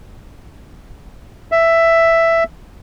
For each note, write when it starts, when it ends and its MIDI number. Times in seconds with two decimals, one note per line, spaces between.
1.52 2.44 76